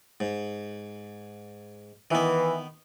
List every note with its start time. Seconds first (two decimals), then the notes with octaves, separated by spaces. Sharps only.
0.20 G#2
2.11 D#3 E3 B3